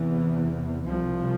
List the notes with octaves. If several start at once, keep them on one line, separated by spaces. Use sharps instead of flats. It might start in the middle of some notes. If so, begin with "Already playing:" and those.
Already playing: E2 C3 E3
C2 C3 F3